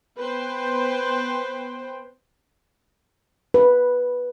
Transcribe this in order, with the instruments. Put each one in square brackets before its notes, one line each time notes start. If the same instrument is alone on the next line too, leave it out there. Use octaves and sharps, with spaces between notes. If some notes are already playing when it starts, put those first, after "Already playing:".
[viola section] B3 B4 C5 G5
[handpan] B4